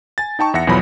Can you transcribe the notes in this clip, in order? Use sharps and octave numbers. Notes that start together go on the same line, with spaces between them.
G#5 A6
D#4 G5 A5 C#6
E2 E5 F#5 A#6 C#7
B1 E2 B2 F3 F#3 B5